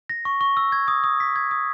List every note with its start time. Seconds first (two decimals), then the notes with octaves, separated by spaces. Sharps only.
0.09 A#6
0.25 C#6
0.41 C#6
0.57 E6
0.72 G#6
0.88 D#6
1.04 D#6
1.20 B6
1.36 G#6
1.51 D#6